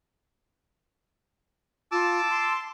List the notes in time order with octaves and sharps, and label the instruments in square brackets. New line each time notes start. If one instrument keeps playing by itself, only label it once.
[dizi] F4 [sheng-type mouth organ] A5 D6 E6
[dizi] C6